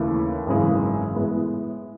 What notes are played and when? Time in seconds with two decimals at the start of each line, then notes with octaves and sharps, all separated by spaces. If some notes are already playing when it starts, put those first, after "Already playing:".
Already playing: D#2 C#3 E3 A3 E4
0.46 G#1 F#2 C#3 E3 G#3
1.14 A2 G#3 B3